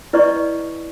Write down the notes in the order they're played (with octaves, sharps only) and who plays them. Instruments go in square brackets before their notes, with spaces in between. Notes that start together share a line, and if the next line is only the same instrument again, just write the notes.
[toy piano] E4 B4 D5 D#5 C#6